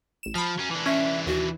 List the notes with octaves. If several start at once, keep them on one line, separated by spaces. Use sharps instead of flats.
A1 E7
F3 B5 F6
F#3 C#4
E3 D4
C#4 E5
D#2 F#4